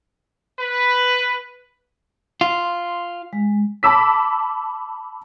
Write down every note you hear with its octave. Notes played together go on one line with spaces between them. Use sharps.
B4
F4 C6
G#3
A5 B5 D6 E6 B6